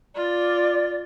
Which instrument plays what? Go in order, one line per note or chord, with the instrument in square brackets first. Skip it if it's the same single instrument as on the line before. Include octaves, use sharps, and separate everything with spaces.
[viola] F4 [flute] D5